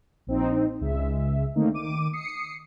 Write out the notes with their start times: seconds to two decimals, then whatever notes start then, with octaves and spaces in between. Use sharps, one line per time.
0.27 A#1 C4 D#4
0.81 C#2 G#3 E5
1.55 D3 D#3 A3 A#3 C4 D#4
1.73 D#3 D6 D#7
2.13 D#6 C7 C#7